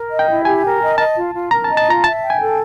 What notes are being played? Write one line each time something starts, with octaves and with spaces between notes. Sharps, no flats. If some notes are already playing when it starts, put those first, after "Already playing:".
Already playing: A#4
D#5
G5
E4
G4 G#5
A#4
D#5
D#5 A5
F4
F4
A#4 A#5
A5
D#5
A5
F4 A#5
E5 A5
G5
G#5
A4